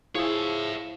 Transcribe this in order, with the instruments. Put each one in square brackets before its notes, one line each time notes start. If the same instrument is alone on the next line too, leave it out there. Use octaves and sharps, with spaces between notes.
[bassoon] F3 [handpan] E4 F4 [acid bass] G#4 [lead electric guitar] C#5 E5